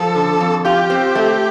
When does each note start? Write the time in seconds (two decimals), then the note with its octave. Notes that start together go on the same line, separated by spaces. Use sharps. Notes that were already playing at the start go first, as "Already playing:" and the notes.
Already playing: F3 A4
0.15 D3
0.40 F2
0.65 F4 G4
0.90 C4
1.15 A3